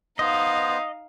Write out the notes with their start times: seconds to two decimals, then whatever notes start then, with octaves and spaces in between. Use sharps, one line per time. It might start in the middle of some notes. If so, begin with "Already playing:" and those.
0.19 B3 D#4 C5 D#5 F5